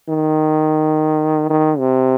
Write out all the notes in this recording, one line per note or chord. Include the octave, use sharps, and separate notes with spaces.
D#3
D#3
C3